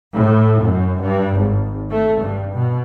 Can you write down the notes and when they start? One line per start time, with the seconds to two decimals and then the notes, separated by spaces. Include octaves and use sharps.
0.14 A2
0.63 F#2
1.02 G2
1.39 G#1
1.90 A3
2.21 G2
2.52 B2